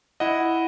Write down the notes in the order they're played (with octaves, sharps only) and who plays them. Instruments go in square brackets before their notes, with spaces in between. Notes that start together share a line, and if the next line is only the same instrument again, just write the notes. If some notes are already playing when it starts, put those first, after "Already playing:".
[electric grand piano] E4 D#5 F#5